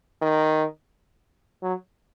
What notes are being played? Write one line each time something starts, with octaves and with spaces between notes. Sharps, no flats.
D#3
F#3